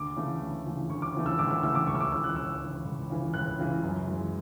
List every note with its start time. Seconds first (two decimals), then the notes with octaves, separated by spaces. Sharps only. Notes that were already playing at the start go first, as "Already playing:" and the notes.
Already playing: D2 D6
0.16 C#3 E3 A3
0.41 D2
0.66 C#3 E3 A3
0.90 D2 C#6
1.02 D6
1.14 C#3 E3 A3
1.26 E6
1.39 D2 D6
1.51 E6
1.63 C#3 E3 A3 E6
1.75 D6
1.87 C#2 C#6
1.95 E6
2.00 D6
2.12 C#3 E3 E6
2.24 F#6
2.36 C#2 E6
2.61 C#3 E3
2.85 C#2
3.10 C#3 E3
3.34 C#2 F#6
3.58 C#3 E3
3.83 F#2
4.07 E3 G#3